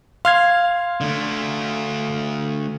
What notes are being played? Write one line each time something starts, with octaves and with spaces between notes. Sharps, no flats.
F5 C6 F6 G#6
D3 A3